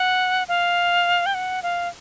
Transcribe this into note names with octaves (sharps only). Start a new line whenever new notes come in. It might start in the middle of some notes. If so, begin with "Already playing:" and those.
Already playing: F#5
F5
G5
F#5
F5